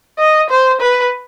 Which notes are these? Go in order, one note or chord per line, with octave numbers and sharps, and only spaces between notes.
D#5
C5
B4